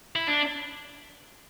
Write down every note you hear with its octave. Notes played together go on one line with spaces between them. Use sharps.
E4
D4